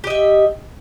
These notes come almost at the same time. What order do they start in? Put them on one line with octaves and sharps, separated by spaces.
G4 D#5 E5